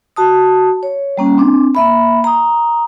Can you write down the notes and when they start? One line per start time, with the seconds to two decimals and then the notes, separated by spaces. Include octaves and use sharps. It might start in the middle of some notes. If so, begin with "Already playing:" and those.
0.16 F#4 A5 D#6
0.83 C#5
1.17 G3 A#3 C#4
1.38 C4 D4
1.75 A#3 E5 B5
2.24 A#5 D#6